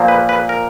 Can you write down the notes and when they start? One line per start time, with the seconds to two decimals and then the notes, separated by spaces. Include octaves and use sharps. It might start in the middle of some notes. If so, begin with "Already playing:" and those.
Already playing: A#2 F3 A#3
0.08 B4
0.29 B4
0.49 A#4